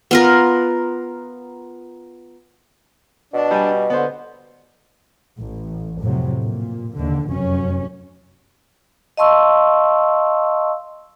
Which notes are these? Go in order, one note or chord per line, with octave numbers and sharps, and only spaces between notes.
B3 F4 A#4
B2 D4
G3 G#5
D3 B3 C5
A1
F2 A2 C3 F#3
A#2
D#2 D3
F1 F#2 C#4
D#5 F5 A5 C6 C#6 E6